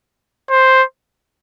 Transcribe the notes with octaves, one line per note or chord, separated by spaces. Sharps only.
C5